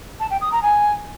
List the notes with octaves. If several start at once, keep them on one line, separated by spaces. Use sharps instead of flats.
A5
G5
D#6
A#5
G#5